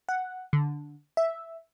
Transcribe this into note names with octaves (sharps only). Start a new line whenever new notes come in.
F#5
D3
E5